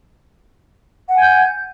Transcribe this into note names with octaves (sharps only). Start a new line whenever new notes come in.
F#5 G#5 G6 G#6